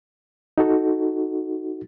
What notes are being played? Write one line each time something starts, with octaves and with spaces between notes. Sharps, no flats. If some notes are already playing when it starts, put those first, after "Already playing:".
D#4 F#4 A4